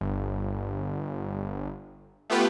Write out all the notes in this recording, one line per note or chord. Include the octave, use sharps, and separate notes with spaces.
G1
A3 B3 F4 G4 B4